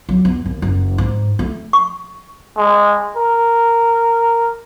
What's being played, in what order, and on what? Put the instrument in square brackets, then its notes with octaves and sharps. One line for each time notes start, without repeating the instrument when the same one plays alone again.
[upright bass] F#3
E2
D#2
F#1
G#2
A3
[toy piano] C#6
[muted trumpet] G#3
A#4